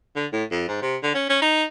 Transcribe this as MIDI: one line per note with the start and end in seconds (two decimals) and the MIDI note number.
0.16 0.27 50
0.32 0.44 45
0.51 0.67 41
0.68 0.81 44
0.82 0.97 48
1.03 1.13 50
1.15 1.26 61
1.30 1.39 61
1.42 1.64 63